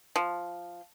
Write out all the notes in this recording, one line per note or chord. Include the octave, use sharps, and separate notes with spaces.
F3